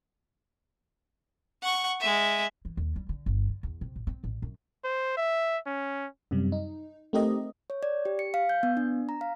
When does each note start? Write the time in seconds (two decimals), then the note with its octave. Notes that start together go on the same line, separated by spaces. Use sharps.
1.62 F#5 C#6
2.00 G#3 E5
2.65 E3
2.77 D#2
2.96 G3
3.09 D3
3.26 G1
3.49 D3
3.63 E2
3.81 C3
3.96 A1
4.07 C4
4.24 A1
4.42 F#2
4.84 C5
5.17 E5
5.67 C#4
6.31 F#2 C3 G3
6.52 D#4
7.13 A3 C4 D#4 G4 A#4 D#5
7.70 C#5
7.83 D5
8.05 G4
8.19 C#7
8.34 F5
8.49 G6
8.63 B3
8.77 D4
9.09 A#5
9.21 F5